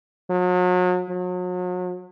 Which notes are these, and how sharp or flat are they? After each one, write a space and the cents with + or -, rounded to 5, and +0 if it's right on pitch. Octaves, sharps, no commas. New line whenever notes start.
F#3 -40
F#3 -40